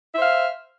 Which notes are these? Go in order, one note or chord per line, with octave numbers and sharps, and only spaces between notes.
C5 E5 F5